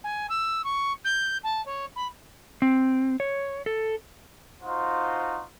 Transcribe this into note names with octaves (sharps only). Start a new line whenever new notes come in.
G#5
E6
C#6
G6
A5
C#5
B5
C4
C#5
A4
D#4 F4 F#4 C5